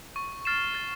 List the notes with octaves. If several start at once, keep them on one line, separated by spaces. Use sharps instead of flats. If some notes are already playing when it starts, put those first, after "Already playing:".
C#6
F6 A6 C7 E7
A6